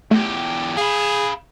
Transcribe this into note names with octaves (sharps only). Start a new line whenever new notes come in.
E2 A3 G4
G#4 F5 B5